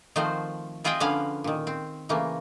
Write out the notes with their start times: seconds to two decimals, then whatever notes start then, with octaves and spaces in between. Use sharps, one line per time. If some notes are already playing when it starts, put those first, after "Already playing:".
0.16 D#3 F3 A3 C4 F#4 C5
0.84 C4 F4 G#4 D#5 E5 G5
1.00 D3 F3 A#3 C#4 B4 F5
1.44 A#2 D#3
1.67 C4
2.09 C#3 E3 A3 A#3